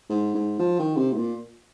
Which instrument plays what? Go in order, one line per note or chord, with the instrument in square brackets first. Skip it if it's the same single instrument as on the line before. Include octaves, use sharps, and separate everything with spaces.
[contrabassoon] G#2
G#2
F3
D#3
C3
G#2
A#2